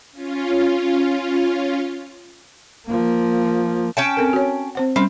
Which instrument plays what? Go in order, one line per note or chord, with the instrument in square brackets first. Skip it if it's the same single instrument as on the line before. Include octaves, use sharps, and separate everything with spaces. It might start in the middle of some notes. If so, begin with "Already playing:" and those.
[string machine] C#4 F4
[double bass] F3 A#3
[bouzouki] C#4 G5 A5
[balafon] C4 A4 A#4
F#4 C#5
C4 C5 F#5
[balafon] G3 C#4 B5 [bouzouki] C4